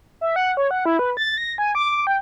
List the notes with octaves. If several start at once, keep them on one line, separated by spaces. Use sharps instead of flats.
E5
F#5
C#5
F#5
E4
B4
A6
A#6
G#5
D6
G5